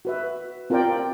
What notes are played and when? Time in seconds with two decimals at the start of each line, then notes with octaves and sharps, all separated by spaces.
0.05 F#4 B4 E5
0.70 C4 F4 A#4 D5 G5